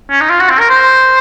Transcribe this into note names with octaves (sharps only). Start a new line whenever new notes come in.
C#4
D#4
F4
F#4
C4
A#4
C5